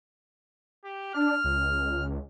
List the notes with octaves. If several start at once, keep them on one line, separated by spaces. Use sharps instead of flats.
G4
D4 F6
C#2